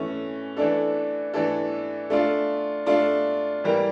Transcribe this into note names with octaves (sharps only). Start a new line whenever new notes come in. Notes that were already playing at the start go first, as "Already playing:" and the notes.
Already playing: E3 A3 C#4
E3 A3 D4 A4
E3 A3 D4 A4
A3 D4 F4
A3 D4 F4
E3 G3 A#3